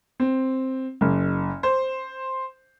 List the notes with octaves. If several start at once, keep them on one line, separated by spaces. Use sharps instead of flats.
C4
F#1
C5